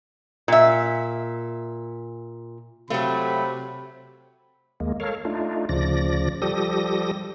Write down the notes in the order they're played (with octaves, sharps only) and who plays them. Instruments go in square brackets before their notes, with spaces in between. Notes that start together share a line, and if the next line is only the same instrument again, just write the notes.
[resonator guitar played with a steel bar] A#2 E5
[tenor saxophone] C3 [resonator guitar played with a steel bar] F#3 A3 [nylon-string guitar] F5 G5 [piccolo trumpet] B5
[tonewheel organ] D#2 G#3 A#3
A4 A#4 C#5 F5
A3 D4 D#4 F4
D2 C#3 F3 D5 A#6
F3 G3 G4 A4 D#6 A#6